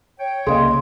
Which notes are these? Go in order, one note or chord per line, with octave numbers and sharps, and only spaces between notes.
C#5 G5
C2 C#3 A#3 G#4 D#5 F5 C6